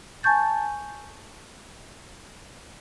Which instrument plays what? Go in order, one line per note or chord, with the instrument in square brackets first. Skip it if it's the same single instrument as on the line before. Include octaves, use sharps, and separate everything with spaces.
[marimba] G#5 A5 C#6 G6 A6